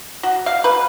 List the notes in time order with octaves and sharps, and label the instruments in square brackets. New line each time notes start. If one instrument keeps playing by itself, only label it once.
[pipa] F#4
F5
B4